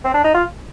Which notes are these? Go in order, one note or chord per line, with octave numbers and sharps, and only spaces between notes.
C4
D4
D#4
F4